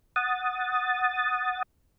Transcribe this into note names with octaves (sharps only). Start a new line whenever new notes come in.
F#5 D#6 A6